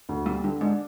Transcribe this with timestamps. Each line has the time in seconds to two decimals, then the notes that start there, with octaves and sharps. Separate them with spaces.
0.09 D2
0.26 A#2 G3
0.44 G2 D3
0.61 G#2 D4